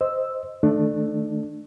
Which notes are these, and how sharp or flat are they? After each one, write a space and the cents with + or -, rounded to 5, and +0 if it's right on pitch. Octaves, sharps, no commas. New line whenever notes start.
C5 +0 D#5 +0 E6 +0
D#3 +0 A3 +0 D4 +25